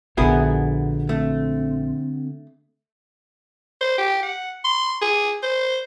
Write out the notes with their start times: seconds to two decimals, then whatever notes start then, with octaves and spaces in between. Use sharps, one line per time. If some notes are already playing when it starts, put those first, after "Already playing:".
0.17 A#1 D3 B3 E4 F#4 G#4 A#4
1.09 A3 C4
3.81 C5
3.98 G4
4.22 F#5
4.64 C6
5.01 G#4
5.43 C5